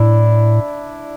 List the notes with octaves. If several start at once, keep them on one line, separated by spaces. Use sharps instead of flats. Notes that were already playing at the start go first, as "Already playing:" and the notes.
Already playing: A2 D4 E4